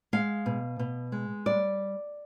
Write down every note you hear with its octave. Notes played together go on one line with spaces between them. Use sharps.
G#3 F5
B2
B2
G#3
G3 D5